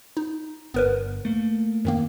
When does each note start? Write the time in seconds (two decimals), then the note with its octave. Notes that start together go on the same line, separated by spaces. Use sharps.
0.17 D#4
0.74 G1 B3 A#4 B4
1.25 A3 A#3
1.85 F#2 D#3 A#3